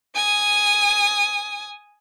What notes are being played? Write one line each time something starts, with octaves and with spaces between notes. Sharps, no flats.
G#5 D#6